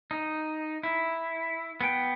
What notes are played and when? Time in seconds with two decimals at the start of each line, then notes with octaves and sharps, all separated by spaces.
0.11 D#4
0.83 E4
1.81 B3 G5